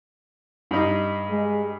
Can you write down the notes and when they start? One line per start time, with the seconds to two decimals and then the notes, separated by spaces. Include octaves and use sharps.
0.71 G2 D#4
1.30 G#3